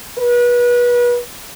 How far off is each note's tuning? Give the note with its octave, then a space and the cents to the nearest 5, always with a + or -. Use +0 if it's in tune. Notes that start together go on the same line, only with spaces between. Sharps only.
B4 -30